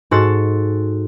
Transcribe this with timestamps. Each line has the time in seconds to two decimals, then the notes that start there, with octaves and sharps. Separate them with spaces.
0.11 G#2 F#4 A4 C6 A6